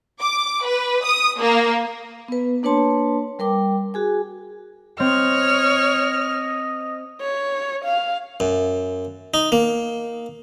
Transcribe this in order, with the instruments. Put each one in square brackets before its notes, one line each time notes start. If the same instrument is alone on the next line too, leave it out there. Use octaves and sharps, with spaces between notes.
[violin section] D6
B4
D#6
A#3
[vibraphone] B3 B4
A#3 D4 B4 C#5 A5 C6
G3 A#4 G5 D6
F#4 G#4 G#5
[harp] C4 [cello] C#5 [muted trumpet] D#5 [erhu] F6
[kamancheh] C#5
F5
[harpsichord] F#2
D#4
A#3